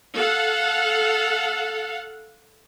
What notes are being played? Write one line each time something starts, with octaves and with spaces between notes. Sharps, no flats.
A4 F5 F#5